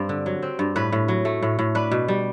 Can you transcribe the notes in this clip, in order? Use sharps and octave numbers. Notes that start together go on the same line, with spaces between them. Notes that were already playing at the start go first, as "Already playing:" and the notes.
Already playing: G2 C4
D3
F#3
C4
G2
A2 B4
A2
F#3
A3
A2
A2
D4 B4
B2
G3